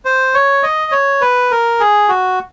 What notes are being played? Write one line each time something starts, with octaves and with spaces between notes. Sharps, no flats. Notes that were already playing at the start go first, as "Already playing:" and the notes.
C5
C#5
D#5
C#5
B4
A#4
G#4
F#4